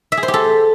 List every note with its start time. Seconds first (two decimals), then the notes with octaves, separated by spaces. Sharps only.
0.12 E5
0.17 G#4
0.23 C5
0.28 G4
0.34 A4